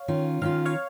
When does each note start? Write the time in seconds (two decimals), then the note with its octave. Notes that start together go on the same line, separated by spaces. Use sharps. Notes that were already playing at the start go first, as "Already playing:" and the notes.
Already playing: C#5 F5
0.08 D#3 C#4 F4
0.42 D#3 C#4 F4 F5
0.65 C#5 F5